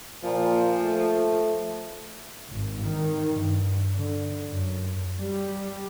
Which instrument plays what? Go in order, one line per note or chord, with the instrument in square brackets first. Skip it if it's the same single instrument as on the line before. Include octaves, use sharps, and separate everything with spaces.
[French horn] A#2 [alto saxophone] F3
[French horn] A3
[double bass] G#1
D#3
G2
D3
F#2
[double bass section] G3